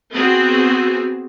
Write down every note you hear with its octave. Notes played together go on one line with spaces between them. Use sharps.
B3 C4 F#4 G#4